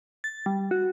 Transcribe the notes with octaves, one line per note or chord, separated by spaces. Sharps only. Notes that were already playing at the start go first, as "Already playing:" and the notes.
A6
G3
F#4